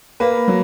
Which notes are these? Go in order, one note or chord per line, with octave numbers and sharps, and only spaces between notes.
A#3 B4
F#3